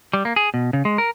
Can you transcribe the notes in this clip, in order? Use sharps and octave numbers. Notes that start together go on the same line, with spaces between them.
G3
A#3
G#4
B2
C#3
G#3
A#4